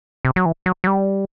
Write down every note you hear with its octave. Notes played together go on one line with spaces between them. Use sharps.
C3
F#3
E3
F#3
F#3
G3